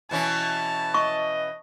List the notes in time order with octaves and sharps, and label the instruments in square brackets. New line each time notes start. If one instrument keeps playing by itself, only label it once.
[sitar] B2 E3 C#4 [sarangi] A5
[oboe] D#5 [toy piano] C#6